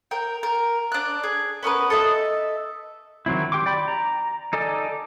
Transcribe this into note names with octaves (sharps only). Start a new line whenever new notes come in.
A#4 G5
A#4
D4 F#6
G#4
B3 C#4 A#4 B4
A4 D#5 E5
D#3 F#3 C4 E4
G4 G5 C6 D6
D5 G5 B5
A#5
D#4 A4 D5 G#5